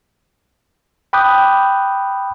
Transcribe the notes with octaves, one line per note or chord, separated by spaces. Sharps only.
G5 B5 D6 D#6 F#6 G6